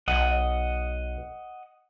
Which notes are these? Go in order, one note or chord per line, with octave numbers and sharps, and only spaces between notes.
B1 D#5 F#5